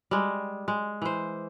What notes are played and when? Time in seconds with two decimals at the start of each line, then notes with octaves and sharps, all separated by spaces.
0.11 G3 G#3
0.68 G#3
1.02 E3 C5